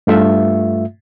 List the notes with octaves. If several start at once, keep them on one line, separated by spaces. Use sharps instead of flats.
G2 A3 F4 E5